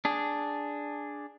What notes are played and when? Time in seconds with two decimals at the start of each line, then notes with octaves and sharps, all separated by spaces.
0.05 D4 G#4